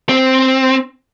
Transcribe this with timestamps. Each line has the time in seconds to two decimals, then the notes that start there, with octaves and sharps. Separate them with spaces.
0.09 C4